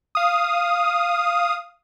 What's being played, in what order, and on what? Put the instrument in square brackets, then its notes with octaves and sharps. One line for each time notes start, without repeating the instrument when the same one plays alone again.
[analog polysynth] F5 D#6